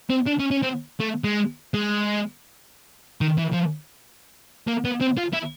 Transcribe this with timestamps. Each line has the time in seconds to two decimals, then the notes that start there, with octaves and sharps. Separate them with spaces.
0.10 C4
0.26 D4
0.39 C#4
0.51 C#4
0.63 C4
1.00 A3
1.24 G#3
1.74 G#3
3.21 D#3
3.38 E3
3.53 F3
4.68 A#3
4.85 B3
5.01 C4
5.18 F4
5.34 E4